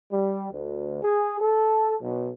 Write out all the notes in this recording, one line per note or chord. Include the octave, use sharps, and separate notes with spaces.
G3
D2
G#4
A4
B1